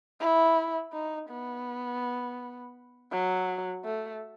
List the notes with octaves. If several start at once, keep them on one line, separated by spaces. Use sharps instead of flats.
E4
D#4
B3
F#3
A3